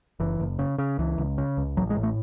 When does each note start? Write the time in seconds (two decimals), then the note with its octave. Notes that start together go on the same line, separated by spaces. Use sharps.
0.20 F#1 E3
0.40 F#1
0.59 C#3
0.78 C#3
0.99 C#2 E3
1.18 C#2
1.38 C#3
1.57 C#2
1.77 A1 F#3
1.90 G#3
1.97 A2
2.03 A3